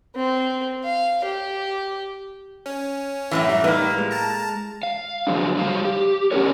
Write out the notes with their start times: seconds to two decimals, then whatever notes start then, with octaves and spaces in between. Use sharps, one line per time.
0.16 C4
0.84 F5
1.24 G4
2.66 C#4
3.31 F#2 A2 E3
3.49 G3
3.64 A2 A#3 D#4 B4
3.98 G#3
4.11 A5 A#5
4.83 F5
5.27 D3 F3 F#3 G#3 D4
5.57 F#3 G3 F5
5.85 G4
6.31 C#4 D4 E4 G#4 A#4 C#5